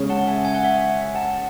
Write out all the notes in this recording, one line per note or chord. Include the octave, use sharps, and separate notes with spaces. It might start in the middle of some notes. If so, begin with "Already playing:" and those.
Already playing: C#3 G#3 C#4 G#4 C#5
F#5 A5
E5 G#5
G#5
F#5
E5 G#5
F#5 A5